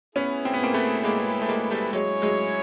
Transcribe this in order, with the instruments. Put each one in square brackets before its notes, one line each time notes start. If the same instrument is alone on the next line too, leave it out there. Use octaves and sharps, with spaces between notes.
[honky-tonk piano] B3 C#4 [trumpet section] E4 G#4 B4
[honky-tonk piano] C4
B3
A#3 C4
A3 B3
G#3 A#3
A3
G#3 A#3
G3 A3
[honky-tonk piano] F#3 G#3 [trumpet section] C#4 E4 G#4 C#5
[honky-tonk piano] F#3 G#3